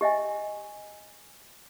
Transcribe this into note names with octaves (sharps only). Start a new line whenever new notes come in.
G4 D#5 E5 G#5